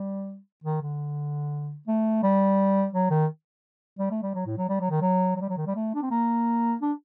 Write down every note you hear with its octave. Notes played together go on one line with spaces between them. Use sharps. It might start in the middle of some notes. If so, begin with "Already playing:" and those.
Already playing: G3
D#3
D3
A3
G3
F#3
D#3
G3
A3
G3
F#3
A2
F#3
G3
F#3
D#3
F#3
F#3
G3
F#3
D#3
G3
A3
D4
C4
A#3
D4